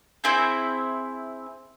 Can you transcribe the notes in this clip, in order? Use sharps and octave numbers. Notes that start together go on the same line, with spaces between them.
C4 E4 G#4 C5